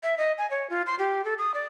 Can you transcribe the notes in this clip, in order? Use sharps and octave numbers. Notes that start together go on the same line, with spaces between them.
E5
D#5
G#5
C#5
F4
C6
G4
A4
D#6
D5